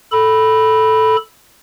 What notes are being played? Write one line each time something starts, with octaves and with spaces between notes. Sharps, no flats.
A4 B5